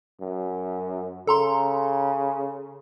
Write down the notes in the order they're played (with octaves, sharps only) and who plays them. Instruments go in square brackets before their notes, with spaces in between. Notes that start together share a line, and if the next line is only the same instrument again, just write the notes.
[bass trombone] F#2
[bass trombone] C#3 [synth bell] A4 A#5 C6